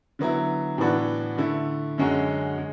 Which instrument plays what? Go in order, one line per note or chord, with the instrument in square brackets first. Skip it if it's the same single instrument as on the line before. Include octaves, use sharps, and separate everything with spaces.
[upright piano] D3 F#3 B3 E4
A2 E3 B3 D4 F#4
D3 A3 E4
F#2 D3 G#3 C#4 F#4
G#3